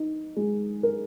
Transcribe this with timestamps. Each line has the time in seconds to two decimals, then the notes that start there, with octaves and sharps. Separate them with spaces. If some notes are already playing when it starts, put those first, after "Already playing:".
Already playing: D#4
0.37 G#3
0.83 A#4